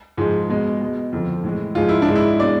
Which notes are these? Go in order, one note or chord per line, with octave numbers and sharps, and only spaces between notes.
G#2 F3 G#3
B2 G#3
B2 G#3
F2 D3 F3
A2 E3 G#3
G#2 F3 G#3 F4
E4
D4
G#2 G#3
E4
B2 G#3 D5